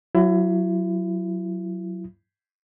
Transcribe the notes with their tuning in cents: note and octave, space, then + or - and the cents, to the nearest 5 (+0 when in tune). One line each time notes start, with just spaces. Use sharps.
F#3 +0 E4 +30